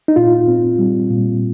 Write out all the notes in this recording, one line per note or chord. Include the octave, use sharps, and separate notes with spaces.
D#4
A#2 F4
C4
G3
A#2